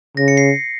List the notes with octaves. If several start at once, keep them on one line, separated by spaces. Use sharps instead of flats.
C#3 A#6
C#7
C7